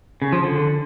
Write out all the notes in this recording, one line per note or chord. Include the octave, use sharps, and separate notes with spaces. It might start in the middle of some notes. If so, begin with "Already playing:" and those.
C#3
F3
D3